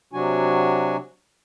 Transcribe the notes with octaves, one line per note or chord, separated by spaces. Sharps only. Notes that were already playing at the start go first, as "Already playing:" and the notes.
C3 F#3 D4 F#4 G#5